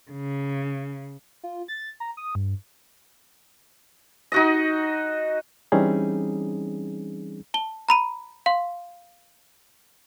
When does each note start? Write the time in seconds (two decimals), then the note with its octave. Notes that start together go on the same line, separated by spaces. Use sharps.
0.11 C#3
1.43 F4
1.68 A6
2.00 A#5
2.17 D#6
2.35 G2
4.32 D#4 F#4 D#5
5.72 E3 G3 C4 C#4 D#4 G#4
7.54 A5 G7
7.89 A#5 B5 D#7
8.46 F5 C6